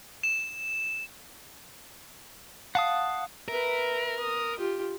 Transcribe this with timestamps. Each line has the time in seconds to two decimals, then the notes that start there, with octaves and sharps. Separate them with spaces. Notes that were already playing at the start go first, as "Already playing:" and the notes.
0.23 E7
2.75 F5 F#5 A5 D#6
3.48 A#4 B4 E5
4.20 D#6
4.59 F4 G4